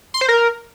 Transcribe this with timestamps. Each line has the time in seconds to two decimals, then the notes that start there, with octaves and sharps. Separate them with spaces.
0.14 C6
0.21 C5
0.28 A#4